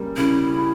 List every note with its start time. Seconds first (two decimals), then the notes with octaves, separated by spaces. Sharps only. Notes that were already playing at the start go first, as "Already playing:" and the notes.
Already playing: C#3 G3 A#3
0.16 C#3 E4